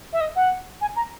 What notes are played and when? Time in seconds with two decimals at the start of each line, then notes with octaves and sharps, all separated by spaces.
0.13 E5
0.21 D#5
0.36 F#5
0.81 G#5
0.96 A#5